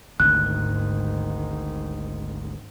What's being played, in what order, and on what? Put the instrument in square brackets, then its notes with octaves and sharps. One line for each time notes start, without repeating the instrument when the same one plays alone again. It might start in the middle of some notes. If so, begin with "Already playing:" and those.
[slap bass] G#1 D2 [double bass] G#2 D#3 [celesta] F#6